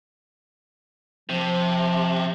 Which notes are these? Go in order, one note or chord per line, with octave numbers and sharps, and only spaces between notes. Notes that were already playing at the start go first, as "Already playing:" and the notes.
C3 F3